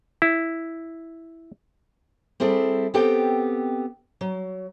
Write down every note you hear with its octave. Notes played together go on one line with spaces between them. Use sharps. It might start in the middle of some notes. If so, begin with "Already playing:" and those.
E4
G3 C4 E4 G#4 A4
B3 C4 G4 A4 G5
F#3